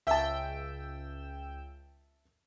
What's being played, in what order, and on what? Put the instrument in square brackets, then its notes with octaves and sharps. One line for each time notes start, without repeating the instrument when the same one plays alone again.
[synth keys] C#2 G5 E6 [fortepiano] E5 A5